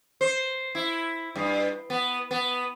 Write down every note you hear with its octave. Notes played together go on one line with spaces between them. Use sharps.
C5
E4
G2
B3
B3